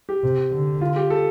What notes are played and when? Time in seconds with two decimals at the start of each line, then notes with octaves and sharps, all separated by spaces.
0.09 G4
0.23 C3
0.52 D3
0.81 F4
0.96 G4
1.10 A4